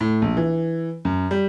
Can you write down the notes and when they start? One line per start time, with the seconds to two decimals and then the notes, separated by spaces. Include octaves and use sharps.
0.01 A2
0.22 A#1
0.37 E3
1.05 F#2
1.31 G3